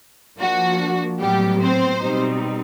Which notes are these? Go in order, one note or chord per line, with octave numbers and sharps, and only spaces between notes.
F3 A#3 D4 F#4
A2 F#3 G3 B3 G4
C4 C5
B2 G3 C4 D#4